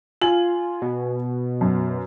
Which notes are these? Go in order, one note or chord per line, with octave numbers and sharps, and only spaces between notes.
F4 G#5 F#7
B2
F#2